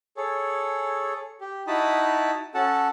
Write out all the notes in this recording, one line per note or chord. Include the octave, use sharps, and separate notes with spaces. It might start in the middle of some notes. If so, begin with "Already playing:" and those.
G#4 A4 C#5
G4
D#4 E4 F#4 A5 B5 D#6
C#4 F#4 A4 F#5 A5